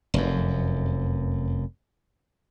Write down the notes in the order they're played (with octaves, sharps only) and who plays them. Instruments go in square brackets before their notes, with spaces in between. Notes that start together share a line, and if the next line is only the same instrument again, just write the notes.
[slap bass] F1 F#2